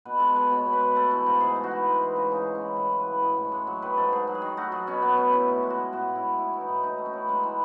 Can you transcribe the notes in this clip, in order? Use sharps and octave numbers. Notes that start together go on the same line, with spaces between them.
B2 B4
G#3 A4
B4
G#3
B2 C#5
B2
B4
G#3
A3 A4
E3
G#2
G#2 G#4
A3
F#4
E3
G#3
E3
C#3
C#3 D#4
G#3
C#4
E3
A2 E4
G#3
B4
G#3
A2 D#5
A2
C#5
G#3
F#3 C#5
D#3 B4
G#2 A4
G#2 G#4
F#3
G#4
D#3
A3 F#4
F#3 G#4
B2 C#4
B2 B3
A3 C#4
F#3 E4
A2 E4
G#3
F#4
G#3
A2 F#4
A2
E4
G#3
A3 E4
E3
D#4
A2
A2 D#4
A3
C#4
E3
G#3 D#4
E3